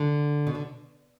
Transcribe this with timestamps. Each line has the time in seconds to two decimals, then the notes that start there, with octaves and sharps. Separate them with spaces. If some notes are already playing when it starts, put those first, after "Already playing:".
Already playing: D3
0.47 B2
0.55 D3